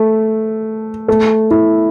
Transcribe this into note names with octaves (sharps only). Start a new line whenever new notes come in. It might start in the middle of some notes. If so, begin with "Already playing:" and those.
Already playing: A3
A3
E4